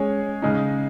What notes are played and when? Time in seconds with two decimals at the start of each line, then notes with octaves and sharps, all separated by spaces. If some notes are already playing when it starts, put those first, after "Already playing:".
Already playing: G#3 C#4 G#4 C#5
0.42 C#3 G#3 D#4